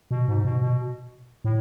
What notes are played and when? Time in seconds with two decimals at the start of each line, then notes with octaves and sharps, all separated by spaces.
0.11 B2
0.28 G#2
0.45 B2
0.62 B2
1.44 A2